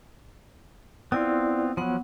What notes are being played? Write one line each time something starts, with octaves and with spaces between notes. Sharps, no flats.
B3 C4 E4 F4 D5
F3 F#3 B3 F#5